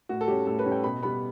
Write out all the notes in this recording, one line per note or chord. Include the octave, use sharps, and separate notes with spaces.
A2 F#4
A4
G3 C#4 G4
A2 A4
B4
G3 C#4
G5
B2 B5
G3 B3 B5